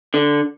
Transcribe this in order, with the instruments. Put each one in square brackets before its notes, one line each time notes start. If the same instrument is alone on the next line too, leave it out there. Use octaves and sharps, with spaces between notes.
[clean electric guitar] D3